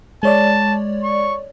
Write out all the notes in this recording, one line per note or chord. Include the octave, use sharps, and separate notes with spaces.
G#3 C#5 D5 A5
C#6